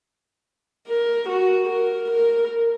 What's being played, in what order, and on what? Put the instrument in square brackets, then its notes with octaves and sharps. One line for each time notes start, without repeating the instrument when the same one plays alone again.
[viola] A#4
F#4
A#4
A#4